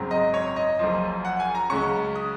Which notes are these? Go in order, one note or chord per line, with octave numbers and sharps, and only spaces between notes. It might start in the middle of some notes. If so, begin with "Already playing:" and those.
Already playing: G#1 F#2 C#3 F#3 C4
D#5
C#5
D#5
F#1 F#2 F3
F#5
G#5
A#5
C#2 C#3 F#3 C#4 C#6
D#6